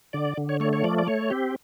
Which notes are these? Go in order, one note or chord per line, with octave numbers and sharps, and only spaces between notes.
D3 D5
D3
C#5
A3 C#5
C#5
F3 D5
D5
A3 C#5
C4 G4